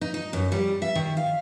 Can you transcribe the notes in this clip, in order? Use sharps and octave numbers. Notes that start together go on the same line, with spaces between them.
D#4
D#4
F#2
G3
E5
D#3
F5